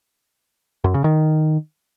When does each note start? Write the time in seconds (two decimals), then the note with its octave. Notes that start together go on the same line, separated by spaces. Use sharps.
0.84 F#2
0.94 C#3
1.04 D#3